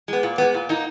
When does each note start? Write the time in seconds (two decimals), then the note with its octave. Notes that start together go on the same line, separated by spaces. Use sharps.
0.08 G#3 B3
0.23 A#2
0.38 G#3 B3
0.54 A#2
0.69 A#3 D#4